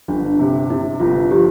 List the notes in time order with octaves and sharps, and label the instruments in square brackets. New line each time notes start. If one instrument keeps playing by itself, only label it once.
[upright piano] G1 [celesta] D4
[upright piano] C3
[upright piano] C3 [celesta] E4
[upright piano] G1 [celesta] F4
[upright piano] F3 [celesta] G4